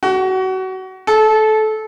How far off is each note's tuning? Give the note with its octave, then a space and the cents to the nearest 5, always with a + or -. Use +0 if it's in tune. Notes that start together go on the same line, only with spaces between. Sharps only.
F#4 +25
A4 -20